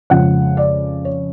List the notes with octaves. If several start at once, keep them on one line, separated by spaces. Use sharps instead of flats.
F2 C#3 G#3 F#5
D5
C#5